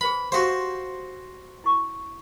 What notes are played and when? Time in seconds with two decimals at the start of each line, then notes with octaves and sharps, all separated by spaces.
0.01 G#4 B4 C5 B5
0.32 F#4 G4 C5 F5 D#6
1.64 E4 C#6